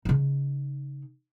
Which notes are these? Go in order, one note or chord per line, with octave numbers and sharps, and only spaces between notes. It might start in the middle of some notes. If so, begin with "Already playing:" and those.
C#3 D#4